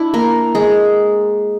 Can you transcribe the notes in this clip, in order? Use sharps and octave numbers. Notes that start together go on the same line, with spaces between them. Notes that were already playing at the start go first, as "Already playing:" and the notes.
Already playing: D4 E4
A#3 A#4
G#3 G#4